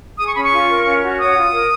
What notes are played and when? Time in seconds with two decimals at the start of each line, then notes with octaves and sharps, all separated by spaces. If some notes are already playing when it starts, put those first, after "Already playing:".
0.18 G#4 D#6
0.25 C#6
0.34 C#4 B5
0.43 C#6
0.51 F4
0.68 A#4
0.85 C#4
1.02 F#4
1.19 C#5 D#6
1.35 F4
1.52 A#4